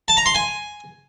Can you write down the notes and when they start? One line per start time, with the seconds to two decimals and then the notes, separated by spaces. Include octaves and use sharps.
0.08 A5
0.17 A#5
0.26 C6
0.35 G#5